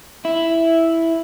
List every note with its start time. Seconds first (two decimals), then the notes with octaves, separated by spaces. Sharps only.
0.25 E4